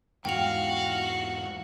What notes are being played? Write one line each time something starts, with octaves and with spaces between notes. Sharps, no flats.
E2 G#2 F#4 F5 G5 F7